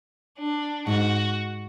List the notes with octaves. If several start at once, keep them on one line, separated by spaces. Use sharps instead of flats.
D4
G#2 F#4